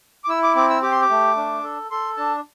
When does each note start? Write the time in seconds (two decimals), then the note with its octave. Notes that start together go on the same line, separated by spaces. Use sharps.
0.24 D6
0.29 E4 E6
0.43 D6
0.55 C4 D6
0.70 E6
0.82 G4 D6
0.91 C6
1.02 D6
1.10 A3
1.37 D4
1.64 A4
1.91 A4 C6
2.17 D4 A5